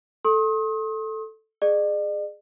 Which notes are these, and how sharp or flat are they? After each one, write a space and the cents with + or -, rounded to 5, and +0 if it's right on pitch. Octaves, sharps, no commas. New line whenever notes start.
A4 +0 C6 +45 D#6 +30
G#4 +0 D5 +45